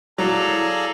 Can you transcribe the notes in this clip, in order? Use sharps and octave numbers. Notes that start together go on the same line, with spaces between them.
F#3 E4 G#4 A4 D5 F5 A#5